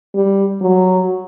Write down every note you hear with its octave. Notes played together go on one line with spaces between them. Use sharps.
G3
F#3